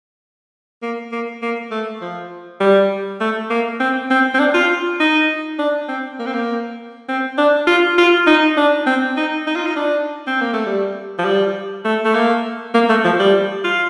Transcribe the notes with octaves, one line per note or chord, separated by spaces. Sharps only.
A#3
A#3
A#3
A3
F3
G3
A3
A#3
C4
C4
C4
D4
F4
D#4
D4
C4
A#3
C4
A#3
C4
D4
F4
F4
D#4
D4
C4
D#4
D#4
F4
D#4
D4
C4
A#3
A3
G3
F3
G3
A3
A3
A#3
A#3
A3
F3
G3
F4